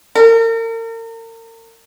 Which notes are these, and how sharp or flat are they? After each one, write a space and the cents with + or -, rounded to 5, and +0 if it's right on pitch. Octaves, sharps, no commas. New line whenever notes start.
A#4 -40